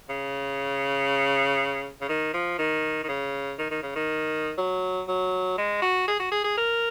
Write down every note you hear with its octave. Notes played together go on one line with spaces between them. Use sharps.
C#3
C#3
D#3
F3
D#3
D#3
C#3
D#3
D#3
C#3
D#3
F#3
F#3
G#3
F#4
G#4
F#4
G#4
G#4
A#4